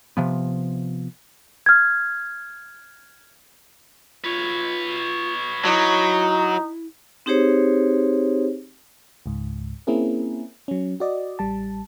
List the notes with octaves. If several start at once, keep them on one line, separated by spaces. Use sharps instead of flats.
C3 F3 B3
F6 G#6
F4 B4 C#5
F#3 D#4 E4
C4 D#4 G4 G#4 C5 C#5
C#2 G#2
A#3 C4 C#4 E4 G#4 A#4
F#3 C#4
F#4 D5 D#5
A1 G3 A5